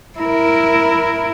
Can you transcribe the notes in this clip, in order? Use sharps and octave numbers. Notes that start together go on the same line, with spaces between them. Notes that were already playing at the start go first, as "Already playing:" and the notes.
E4 A#4